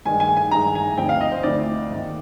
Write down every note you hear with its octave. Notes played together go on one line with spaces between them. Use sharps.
G2 D#3 G#3 G#5
G#5
G#5
G2 D#3 G#3 A#5
G#5
D2 D3 F3 C4 D#4 G5
F5
D#5
C5
D2 D3 F3 C4 D#4 D5
G#2 D#3 A#3